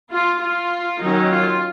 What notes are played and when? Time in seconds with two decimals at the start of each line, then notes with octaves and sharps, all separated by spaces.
0.09 F4
0.40 F4
1.00 D#3 F#3 C#4 D#4
1.30 F4